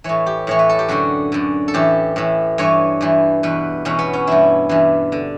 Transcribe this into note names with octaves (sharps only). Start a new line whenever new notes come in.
A2 E3 C#5
G4
A2 E3 C#5
B4
A4
G4
F#2 D3 F#4
F#2 D3
A4
A2 E3 G4
A2 E3
G2 E3 C#5
G2 E3
E2 B2 B4
E2 B2 C#4
B3
C#4
G2 E3 E4
G2 E3
D3